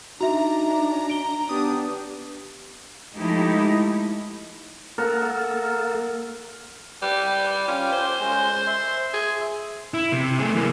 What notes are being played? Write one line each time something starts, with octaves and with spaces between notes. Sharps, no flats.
D4 D#4 F#4 E5 A#5
D7 G7
B3 D4 G4 D#6
F3 G#3 A3 D#4 E4 G4
A#3 A4 A#4 F#5
G3 B4 G5 D6
C#4 F4 G5 D6
C5
G#3 C#4
E5 C6
G#4
E4
C3
A3 G#4
E3 A#3